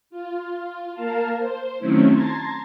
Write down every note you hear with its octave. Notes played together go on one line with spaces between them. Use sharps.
F4
A#3 A#4 F5 A5
C5
D#3 F#3 A3 C4 C#4 E4
A5 A#5 C6 G#6 A6